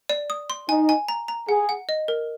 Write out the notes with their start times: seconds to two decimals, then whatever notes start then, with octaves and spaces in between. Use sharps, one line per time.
0.09 D5
0.30 D#6
0.50 C6
0.69 D#4 G#5
0.89 G#5
1.08 A#5
1.28 A#5
1.49 G#4 F#5
1.69 F#5
1.89 D#5
2.08 A#4